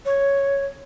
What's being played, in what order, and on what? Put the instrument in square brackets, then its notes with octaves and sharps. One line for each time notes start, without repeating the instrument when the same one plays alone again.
[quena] C#5